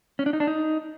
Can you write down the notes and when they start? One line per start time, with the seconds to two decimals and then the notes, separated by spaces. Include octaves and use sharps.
0.19 C#4
0.26 D4
0.33 D#4
0.40 D4
0.47 D#4